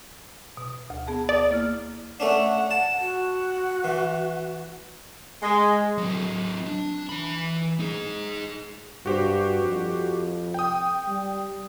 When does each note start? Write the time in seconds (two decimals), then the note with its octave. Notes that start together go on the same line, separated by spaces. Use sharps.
0.57 B2
0.90 D2
1.07 B3 G#4 A5
1.29 D5 D#6
1.51 A#3 E4 F6
2.20 A3 C#4 D4 F#5
2.71 A5
3.00 F#4
3.84 E3
5.43 G#3
5.98 F#3 C4
6.66 D4
7.09 E3 B5
7.80 D#4 G#4
9.06 G2 F#4 G4 C5
9.63 F2
10.54 G5 D#6
11.07 G3